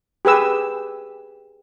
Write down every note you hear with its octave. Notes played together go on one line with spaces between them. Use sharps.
G4 G#4 B4 E6